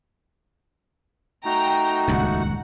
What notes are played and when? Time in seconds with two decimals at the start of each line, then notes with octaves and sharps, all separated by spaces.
1.45 A3 D#4 F#4 G5 A#5
2.08 D#1 C#2 G2 F#5